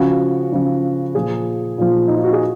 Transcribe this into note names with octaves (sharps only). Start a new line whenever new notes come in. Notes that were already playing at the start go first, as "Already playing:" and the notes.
Already playing: C#3 F3 F#4
C#3 F3
A#2 F3 G#4
A#2 F3
D#4
F4
F#4
G#4